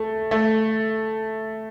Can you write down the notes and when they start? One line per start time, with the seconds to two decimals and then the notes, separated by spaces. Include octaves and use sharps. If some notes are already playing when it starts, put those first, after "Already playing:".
Already playing: A3
0.31 A3